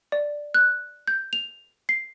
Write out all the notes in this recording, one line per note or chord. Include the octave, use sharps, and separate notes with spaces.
D5
F#6
G6
F7
C7